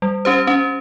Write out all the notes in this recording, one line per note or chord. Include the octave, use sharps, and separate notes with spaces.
G3
C#4 G4 C5
C#4